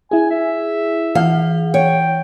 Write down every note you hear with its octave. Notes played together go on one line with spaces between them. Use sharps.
E4 G#4 G#5
E5
E3 F5 F#5
C#5 G5